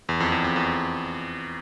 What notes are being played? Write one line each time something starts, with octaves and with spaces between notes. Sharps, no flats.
E2
F2
E2
F2
E2